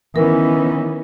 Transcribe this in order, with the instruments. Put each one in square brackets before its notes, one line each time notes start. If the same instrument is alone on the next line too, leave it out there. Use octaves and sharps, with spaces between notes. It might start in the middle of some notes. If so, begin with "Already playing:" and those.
[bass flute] D#3 [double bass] E3 [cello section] B3 C#4 D#4 [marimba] A#4